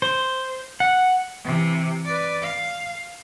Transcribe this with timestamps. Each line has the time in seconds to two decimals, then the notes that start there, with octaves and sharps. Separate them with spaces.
0.02 C5
0.80 F#5
1.44 C3 E3
2.05 B4 D5
2.42 F5